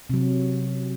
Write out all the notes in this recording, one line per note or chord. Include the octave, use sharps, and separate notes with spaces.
C3 F#3